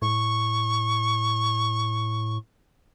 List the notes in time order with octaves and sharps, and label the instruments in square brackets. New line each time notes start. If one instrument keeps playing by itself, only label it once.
[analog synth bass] A2 [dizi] C#6